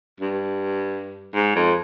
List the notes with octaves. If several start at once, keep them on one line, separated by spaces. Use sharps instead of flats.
G2
G#2
F2